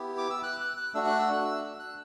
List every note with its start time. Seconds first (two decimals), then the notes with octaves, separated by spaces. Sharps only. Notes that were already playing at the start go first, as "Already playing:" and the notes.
Already playing: B3 E4 G4
0.18 D6
0.30 E6
0.43 F#6
0.61 F#6
0.77 F#6
0.94 A3 D4 F#4 E6
1.07 F#6
1.19 E6
1.33 F#6
1.45 E6
1.79 F#6